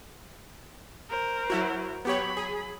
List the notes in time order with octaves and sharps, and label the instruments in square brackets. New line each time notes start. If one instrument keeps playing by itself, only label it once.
[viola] A#4 C5
[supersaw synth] F#3 E4 F#4
[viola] F#3 B5 [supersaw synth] B3 G4 C#5
[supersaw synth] G#4